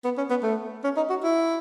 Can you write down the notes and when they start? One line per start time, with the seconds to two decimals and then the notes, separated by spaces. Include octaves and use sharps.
0.05 B3
0.17 C#4
0.30 B3
0.43 A3
0.84 C#4
0.97 D#4
1.10 F#4
1.23 E4